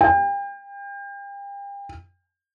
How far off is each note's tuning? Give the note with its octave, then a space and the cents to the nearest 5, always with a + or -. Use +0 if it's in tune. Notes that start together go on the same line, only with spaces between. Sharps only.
G5 +35